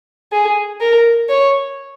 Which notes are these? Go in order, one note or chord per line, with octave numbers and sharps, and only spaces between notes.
G#4
A#4
C#5